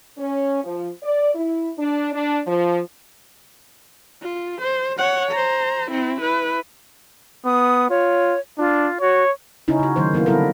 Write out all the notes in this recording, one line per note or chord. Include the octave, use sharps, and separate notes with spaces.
C#4
F3
D5
E4
D4
D4
F3
F4
C5
C#5 F#5
C5 A#5
C4 E4
E4 B4
B3 D#6
F4 C#5
D4 F4
F#4 C#5
C#3 C#4 D#4 E4
C#3 F#4
D#3 F#3 A3 C5
F#3 A#3 B3 E4
D3 G3 C4 E4 A4 A#4